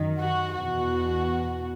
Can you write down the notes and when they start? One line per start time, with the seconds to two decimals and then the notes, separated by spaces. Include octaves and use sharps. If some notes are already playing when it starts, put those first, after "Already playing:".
Already playing: F#2 D#3
0.20 F#4
0.55 E2 B2 F#4